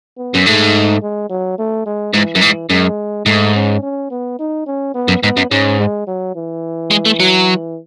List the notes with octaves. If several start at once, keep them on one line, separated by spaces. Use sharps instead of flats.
B3
F#2
G#2 A3
G#3
F#3
A3
G#3
G#2 E3
F#2
G#2
F#2 G#3
G#2 A3
C#4
C#4
B3
D#4
C#4
B3
F#2
G#2 B3
F#2
G#2 C#4
G#3
F#3
E3
G#3
A3
F#3